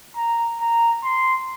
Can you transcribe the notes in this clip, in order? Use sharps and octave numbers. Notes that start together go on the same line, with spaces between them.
A#5
A#5
C6